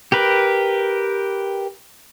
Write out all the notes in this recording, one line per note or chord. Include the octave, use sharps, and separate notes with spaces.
G4 A#4 B4